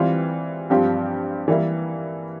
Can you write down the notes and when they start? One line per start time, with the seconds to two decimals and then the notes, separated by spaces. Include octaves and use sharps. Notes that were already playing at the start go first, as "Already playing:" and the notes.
Already playing: E3 G3 C4 F4
0.70 G2 F3 C4 G4
1.48 E3 G3 A#3 E4